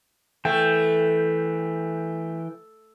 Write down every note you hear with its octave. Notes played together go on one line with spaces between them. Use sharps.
E3 A3 G5